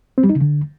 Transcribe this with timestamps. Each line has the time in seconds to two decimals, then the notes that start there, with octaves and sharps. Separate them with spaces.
0.18 C4
0.24 G3
0.30 D#4
0.35 C#3
0.41 D3